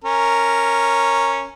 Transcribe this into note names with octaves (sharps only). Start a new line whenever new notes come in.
C#4 A#4